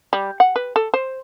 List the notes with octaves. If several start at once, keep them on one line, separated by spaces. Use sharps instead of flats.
G3
F#5
B4
A4
C5